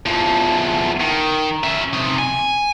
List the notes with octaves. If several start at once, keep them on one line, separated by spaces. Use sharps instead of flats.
E2 F3
D#3
C#4 E5
C3 D#4
G#5